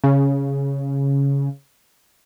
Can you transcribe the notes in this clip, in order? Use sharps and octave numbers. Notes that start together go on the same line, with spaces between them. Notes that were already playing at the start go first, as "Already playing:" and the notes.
C#3